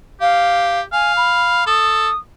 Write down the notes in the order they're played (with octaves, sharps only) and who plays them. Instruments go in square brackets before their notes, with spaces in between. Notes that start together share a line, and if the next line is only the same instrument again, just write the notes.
[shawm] G4 [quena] F5
[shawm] F5 [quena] G#5
[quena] B5
[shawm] A4 [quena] D#6